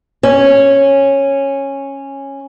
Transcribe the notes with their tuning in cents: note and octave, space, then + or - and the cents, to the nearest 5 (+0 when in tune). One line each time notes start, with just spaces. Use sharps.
C#4 -10